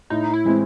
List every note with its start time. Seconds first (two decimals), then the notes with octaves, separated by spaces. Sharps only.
0.10 A2 D#4
0.34 E4
0.45 E3 G#3 C4